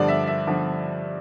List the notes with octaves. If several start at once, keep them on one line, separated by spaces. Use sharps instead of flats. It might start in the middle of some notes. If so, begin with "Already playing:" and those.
Already playing: G2 D3 F3 D5
E5
E5
D3 F3